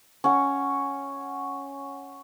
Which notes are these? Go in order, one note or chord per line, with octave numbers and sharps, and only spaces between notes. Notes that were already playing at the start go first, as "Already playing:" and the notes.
C#4 F#5